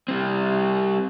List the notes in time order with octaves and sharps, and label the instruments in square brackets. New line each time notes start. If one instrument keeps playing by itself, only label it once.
[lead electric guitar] G3 C4